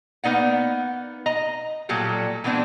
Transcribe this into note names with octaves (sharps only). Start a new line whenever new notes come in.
A#3 B3 D#4 D5 F#5
D#5 A#5
A#2 F#3 G3 G4 A4
E3 G#3 B3 C4 D4